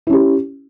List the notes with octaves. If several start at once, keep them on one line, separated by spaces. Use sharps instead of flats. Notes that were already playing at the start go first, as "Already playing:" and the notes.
C#4 E4 G4